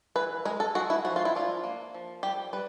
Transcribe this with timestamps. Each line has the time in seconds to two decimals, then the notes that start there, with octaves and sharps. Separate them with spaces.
0.15 E3 B4
0.45 G#3 A#4
0.60 A4
0.75 G#3 F#4
0.90 E4
1.05 F3 F#4
1.16 F4
1.25 E4
1.35 D4 F4
1.64 A#3
1.94 F3
2.23 G3 G4
2.53 G3 B4